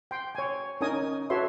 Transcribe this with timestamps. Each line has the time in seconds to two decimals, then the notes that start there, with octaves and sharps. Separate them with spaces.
0.11 G5 C6
0.35 C#5 G#5
0.81 C#4 D#4 A#4 D#5 G#5 D#6
1.30 F#4 A4 B4 C#5 E5 C6